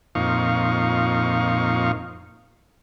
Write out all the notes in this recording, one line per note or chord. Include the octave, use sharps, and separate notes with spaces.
F2 A#2 D#4 F5 C#6